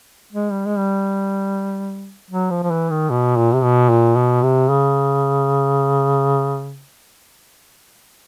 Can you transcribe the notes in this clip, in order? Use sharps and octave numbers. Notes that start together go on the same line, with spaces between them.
G#3
G3
G#3
G3
F#3
F3
F3
E3
D#3
B2
A#2
C3
B2
A#2
B2
C3
C#3